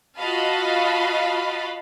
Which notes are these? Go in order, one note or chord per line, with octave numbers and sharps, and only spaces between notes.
F4 F#4 D#5 F5 A5 B5